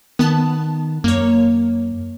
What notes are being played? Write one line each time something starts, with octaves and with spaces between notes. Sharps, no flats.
D#3 B3 A5
F#2 A#3 C#5